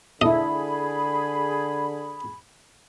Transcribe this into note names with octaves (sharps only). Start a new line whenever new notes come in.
D3 E4 G#4 A4 D#5 B5